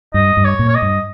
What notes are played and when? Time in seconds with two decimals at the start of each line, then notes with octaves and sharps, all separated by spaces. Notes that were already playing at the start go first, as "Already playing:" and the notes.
0.14 G2 D#5
0.37 G2
0.44 C#5
0.59 A#2
0.68 C#5
0.75 D#5
0.82 G2